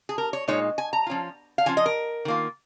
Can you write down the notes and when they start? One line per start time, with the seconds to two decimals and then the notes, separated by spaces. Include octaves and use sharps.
0.09 G#4
0.18 A#4
0.33 C#5
0.48 A#2 G#3 D#4 C#5
0.78 G#5
0.93 A#5
1.07 F3 C#4 F4
1.58 F5
1.66 F3 C#4 F4 G#5
1.77 D#5
1.86 A#4
2.25 D#3 A#3 F4